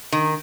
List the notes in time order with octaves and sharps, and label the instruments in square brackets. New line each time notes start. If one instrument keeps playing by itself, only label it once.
[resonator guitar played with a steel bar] D#3